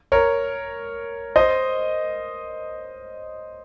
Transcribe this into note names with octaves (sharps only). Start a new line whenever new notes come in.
A#4 C#5
C5 D#5